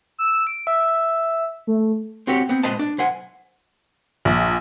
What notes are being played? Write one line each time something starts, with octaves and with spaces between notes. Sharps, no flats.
E6
D7
E5
A3
C4 F#4 G4 C#5
B3 C4
A#2 G#3 B4 C5 D#5 A5
D4
B1 C5 F#5 G#5
A#1